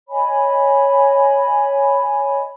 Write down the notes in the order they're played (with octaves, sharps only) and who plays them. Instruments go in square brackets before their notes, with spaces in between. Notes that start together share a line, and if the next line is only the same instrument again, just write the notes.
[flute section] C#5 D#5 G#5 B5